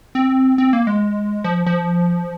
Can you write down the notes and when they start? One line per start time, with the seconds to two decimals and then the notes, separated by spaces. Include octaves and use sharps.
0.15 C4
0.58 C4
0.73 A#3
0.87 G#3
1.44 F3
1.66 F3